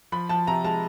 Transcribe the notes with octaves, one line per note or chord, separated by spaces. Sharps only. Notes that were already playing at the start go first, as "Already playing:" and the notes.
F3 B5
F3 A5
C3 A#5
G#3 A5